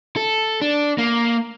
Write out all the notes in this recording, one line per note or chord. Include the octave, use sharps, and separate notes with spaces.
A4
D4
A#3